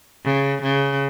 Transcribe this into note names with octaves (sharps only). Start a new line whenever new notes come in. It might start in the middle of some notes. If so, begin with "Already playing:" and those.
C#3
C#3